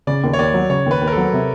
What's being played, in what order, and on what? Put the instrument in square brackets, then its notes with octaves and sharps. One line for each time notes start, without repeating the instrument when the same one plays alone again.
[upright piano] C#3 [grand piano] D5
[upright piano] D#2
[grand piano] C#5
[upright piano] D#2 [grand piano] D5
[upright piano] F#3
[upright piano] C#3 [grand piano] C#5
[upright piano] D#2 [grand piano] B4
[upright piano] D#2
[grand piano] A#4
[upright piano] F#3 [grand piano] A4
[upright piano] C3